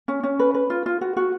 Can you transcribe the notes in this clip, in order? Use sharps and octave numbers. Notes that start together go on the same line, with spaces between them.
C#4
C#4
B4
B4
F4
F4
F#4
F#4